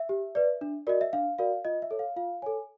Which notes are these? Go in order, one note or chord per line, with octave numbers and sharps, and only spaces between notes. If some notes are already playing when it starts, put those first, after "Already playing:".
Already playing: E5
G4
B4 D5
D4
F#4 A#4 D5 D#5
E5
D4 F5
F#4 A#4 D5 F5
F4 D#5
E5
A4 C#5
F5
F4 F5
A4 C#5 G#5